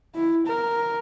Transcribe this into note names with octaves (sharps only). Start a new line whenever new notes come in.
E4
A#4